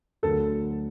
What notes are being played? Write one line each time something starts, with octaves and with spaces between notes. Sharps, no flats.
D2 D3 F#3 A4